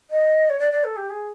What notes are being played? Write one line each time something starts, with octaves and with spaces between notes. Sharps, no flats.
D#5
C#5
D5
D5
A4
G4
G#4